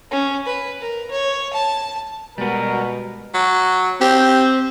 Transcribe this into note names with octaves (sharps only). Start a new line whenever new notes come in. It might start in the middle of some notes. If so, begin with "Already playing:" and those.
C#4
B4
A#4
C#5
A5
B2 G3 G#3 B3 A#4
F#3
C4 G4